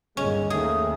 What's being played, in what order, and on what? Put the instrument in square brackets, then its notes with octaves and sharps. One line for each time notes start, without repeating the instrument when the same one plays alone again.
[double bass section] G1 D#2 [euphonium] G#3 [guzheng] C#4
[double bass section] D#2 D#3 [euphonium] A3 [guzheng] G#4